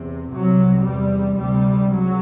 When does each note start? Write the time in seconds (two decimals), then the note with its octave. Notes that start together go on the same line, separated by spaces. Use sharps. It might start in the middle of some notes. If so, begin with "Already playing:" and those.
Already playing: E2 C3
0.32 C2 C3 F#3
0.84 E2 C3 G3
1.36 D2 C3 G3
1.91 C#2 F#3